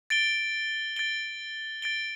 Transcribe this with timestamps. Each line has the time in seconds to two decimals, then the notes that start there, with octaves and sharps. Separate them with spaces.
0.10 A6 D7 G7
0.96 A6 D7 G7
1.82 A6 D7 G7